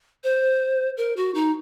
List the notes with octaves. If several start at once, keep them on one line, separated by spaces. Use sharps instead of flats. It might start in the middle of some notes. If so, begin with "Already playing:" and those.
C5
A#4
F#4
D#4